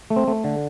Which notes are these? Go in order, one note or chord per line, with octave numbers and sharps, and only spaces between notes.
A3
C4
A3
D3